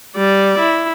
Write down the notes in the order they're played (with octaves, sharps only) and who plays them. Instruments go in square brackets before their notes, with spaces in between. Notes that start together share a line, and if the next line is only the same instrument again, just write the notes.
[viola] G3 D5
E4